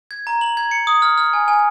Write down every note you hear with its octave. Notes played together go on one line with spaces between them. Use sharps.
G#6
A#5
F#7
G#6
C#7
D#6
F6
F6
G#5
G#5